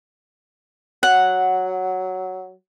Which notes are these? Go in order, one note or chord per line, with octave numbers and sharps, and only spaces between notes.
F#3 F#5